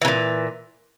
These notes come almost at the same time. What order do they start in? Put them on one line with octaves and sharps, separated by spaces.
E3 C#3 A#2